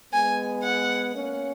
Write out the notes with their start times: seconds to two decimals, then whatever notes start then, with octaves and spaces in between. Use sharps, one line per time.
0.13 G#3 B3 G#5
0.63 F#5
1.13 A#3 C#4